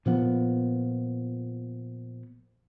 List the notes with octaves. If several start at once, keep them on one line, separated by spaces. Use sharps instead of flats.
A#2 F3 B3